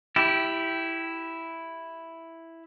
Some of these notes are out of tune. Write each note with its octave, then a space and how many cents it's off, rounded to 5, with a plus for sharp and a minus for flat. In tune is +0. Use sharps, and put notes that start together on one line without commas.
E4 +0 G4 -10